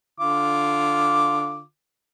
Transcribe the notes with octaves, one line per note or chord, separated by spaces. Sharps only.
D3 F4 D6